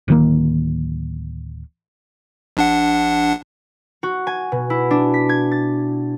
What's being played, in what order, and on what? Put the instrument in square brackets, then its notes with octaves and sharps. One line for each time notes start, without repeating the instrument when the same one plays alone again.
[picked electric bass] D1 D#3 A#3
[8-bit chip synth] A#1 D4 F#5
[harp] F#4
G#5
B2
E4
D4
B6
G#6
A6